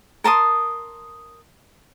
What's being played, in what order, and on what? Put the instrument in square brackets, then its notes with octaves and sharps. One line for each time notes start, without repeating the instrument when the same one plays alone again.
[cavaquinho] A#4 A5 C6 D#6